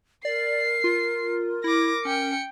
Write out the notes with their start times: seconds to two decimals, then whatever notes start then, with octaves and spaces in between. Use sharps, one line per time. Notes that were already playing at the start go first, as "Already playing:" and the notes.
0.25 A#4 D5 C7
0.84 F4
1.64 E4 D6 A#6
2.05 C#4 G5 C#7